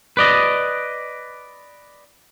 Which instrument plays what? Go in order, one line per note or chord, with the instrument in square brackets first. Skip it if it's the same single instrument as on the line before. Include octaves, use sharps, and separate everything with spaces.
[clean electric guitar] B4 D5 D#5